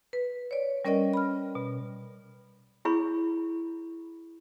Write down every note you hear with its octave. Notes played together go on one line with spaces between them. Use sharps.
B4
C#5 D5
G3 C#4 A#4 D5 D#5 G5
B5 F6
B2
E4 G#4 C#5 B5 C#6